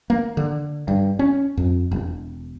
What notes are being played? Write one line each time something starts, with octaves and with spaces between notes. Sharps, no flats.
A#3
D3
G2
C#4
F2
E1